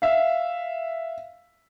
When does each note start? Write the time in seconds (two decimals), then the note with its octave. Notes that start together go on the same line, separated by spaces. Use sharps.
0.02 E5 F5